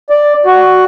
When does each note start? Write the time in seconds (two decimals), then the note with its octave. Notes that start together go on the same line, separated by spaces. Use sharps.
0.10 D5
0.46 F#4